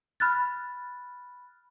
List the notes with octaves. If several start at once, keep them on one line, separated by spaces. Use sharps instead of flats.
B5 F6 F#6 A6